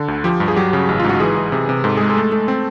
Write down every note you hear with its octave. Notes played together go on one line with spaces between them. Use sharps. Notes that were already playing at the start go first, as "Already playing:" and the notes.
Already playing: D3
D2
F3 G4
G2
G#4
F#3 G4
C#3
A1
F4
G#2 F#4
E3 G#4
E3
C3
C3
G#2 A4
G#3 G#4
A4
A3
A3
C4